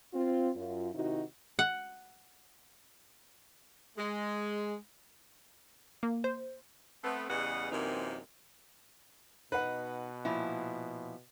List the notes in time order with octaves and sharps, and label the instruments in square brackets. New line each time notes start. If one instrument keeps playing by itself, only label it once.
[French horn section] C4 F4
F#2 F4
C3 D#3 D#4 E4 F#4
[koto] F#5
[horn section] G#3
[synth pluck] A#3
C5
[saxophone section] A3 B3 C4
E2 C#3 G3 B3 D#5 F#5
F#2 C3 E3 A#3 C4 D#4
[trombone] B2 [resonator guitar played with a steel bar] D#4 [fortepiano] B4 F#5
[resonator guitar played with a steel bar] A#2 F3 E4